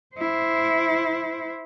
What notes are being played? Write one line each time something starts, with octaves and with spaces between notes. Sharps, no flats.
E4 C5